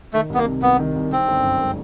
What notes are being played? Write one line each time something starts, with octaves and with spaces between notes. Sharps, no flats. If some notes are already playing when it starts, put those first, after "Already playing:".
D#3 A3
C2 B3
A#3
C3
C2 B3
D#3
C2
D#3 C4
G1
F#2
G#3